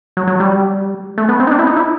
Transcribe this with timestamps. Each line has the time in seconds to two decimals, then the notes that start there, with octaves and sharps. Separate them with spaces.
0.17 F#3
0.27 F#3
0.40 G3
1.18 A3
1.29 B3
1.40 C4
1.47 D#4
1.51 D4
1.59 E4
1.67 D#4
1.77 E4